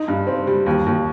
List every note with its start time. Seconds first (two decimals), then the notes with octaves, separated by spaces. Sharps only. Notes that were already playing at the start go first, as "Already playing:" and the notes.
Already playing: D#4
0.08 G2
0.27 C4
0.47 G3
0.66 D#2
0.86 D#2